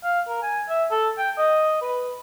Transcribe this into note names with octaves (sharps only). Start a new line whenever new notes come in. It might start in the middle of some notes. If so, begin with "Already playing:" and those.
F5
A#4
G#5
E5
A4
G5
D#5
B4